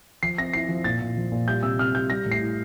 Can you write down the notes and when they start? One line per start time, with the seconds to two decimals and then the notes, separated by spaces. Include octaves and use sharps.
0.23 F3 C7
0.38 C4 A#6
0.53 E4 C7
0.69 F3
0.84 A#2 A6
1.01 A#2
1.17 F3
1.32 A#2
1.47 G3 G6
1.63 C3 E6
1.79 C3 F6
1.95 G3 G6
2.10 G3 A#6
2.26 A2
2.32 C7
2.41 E4